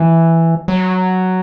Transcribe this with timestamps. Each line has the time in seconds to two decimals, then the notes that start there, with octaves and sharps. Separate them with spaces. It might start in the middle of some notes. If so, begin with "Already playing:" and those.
Already playing: E3
0.68 F#3